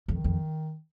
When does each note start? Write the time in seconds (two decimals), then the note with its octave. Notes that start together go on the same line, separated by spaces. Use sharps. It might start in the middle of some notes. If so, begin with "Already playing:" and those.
0.08 F2 D#3
0.24 F2